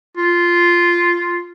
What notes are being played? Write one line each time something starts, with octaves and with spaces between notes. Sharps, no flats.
F4